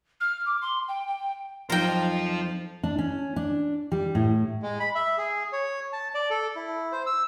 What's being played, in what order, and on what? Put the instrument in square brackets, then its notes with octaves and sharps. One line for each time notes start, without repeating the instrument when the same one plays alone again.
[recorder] F6
D6
C6
G5
G5
[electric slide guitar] F2 [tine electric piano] F#3 D#4 [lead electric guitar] F4 C5 [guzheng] A#4 G5
[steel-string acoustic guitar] D4
C#4
D4
G3
A2
[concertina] G#3
B5
E5
G#4
C#5
A5
D5
A4
E4
C5
E6